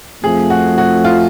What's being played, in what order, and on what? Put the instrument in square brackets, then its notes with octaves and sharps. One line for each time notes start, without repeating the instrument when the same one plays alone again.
[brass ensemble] F2 F3 A3 [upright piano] G#4
[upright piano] F#4
F#4
F4